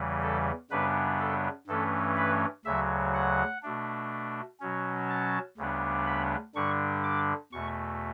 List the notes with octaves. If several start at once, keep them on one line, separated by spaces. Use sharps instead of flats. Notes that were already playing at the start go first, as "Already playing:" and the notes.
Already playing: E2 C#3 E3 G3
A4
F#2 C#3 G3 B3 D4 B4
A4
G2 E3 A3 C#4 A4
B4
D2 C#3 F#3 E5
F#5
B2 A3 D4
B2 F#3 C#4
A5
D2 C#3 G3 B3 D4
B5
G2 D3 G3 D4 C#6
D6
E2 B2 A3 C#6